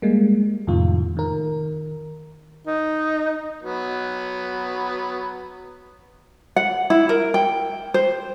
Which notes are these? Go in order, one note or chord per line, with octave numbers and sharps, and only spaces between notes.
G3 G#3 A#3
F2 A2 C3 D#3 F4
D#3 A#4
D#4
F#3 B3
F#5
E4
A#4
G5
C5